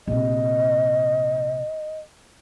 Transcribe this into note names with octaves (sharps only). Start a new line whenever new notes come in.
A#1 C3 D#5